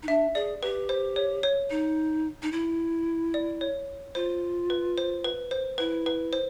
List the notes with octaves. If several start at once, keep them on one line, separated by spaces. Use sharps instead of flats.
D#4
D4 E5
G#4 D5
G4 B4
C5
C#5
C#5
D#4
D#4
E4
D5
C#5
F4 C5
B4
C5
B4
C5
E4 B4
B4
C5